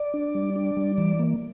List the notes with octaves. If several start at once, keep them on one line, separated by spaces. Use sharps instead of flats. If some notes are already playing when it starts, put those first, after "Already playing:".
Already playing: D5
D4
G3
D4
G3
E3
A#3